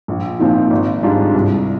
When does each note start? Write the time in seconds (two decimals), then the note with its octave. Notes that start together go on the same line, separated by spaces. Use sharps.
0.08 A#1
0.39 A#2 F3 C4 D#4
0.71 G#1
1.02 G#2 G3 D4 F4
1.34 C2